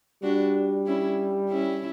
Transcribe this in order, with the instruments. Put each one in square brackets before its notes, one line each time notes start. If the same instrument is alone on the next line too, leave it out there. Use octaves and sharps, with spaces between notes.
[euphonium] G3 [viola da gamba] D4 F#4
[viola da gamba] C#4 E4
C#4 E4